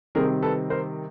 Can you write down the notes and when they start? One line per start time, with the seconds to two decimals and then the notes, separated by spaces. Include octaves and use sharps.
0.15 C3 D#3 G3 C4 G#4 A#4
0.42 A4 B4
0.70 A#4 C5